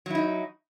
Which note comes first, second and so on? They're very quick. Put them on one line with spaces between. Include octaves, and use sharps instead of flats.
F#3 E4 D#4